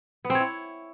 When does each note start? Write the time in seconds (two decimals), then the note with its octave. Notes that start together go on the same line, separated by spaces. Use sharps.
0.25 B3
0.30 C4
0.35 C#5
0.40 E4